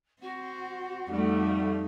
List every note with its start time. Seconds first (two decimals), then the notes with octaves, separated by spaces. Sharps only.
0.22 C4 F#4 F#5
1.10 F2 G3 A3 D#4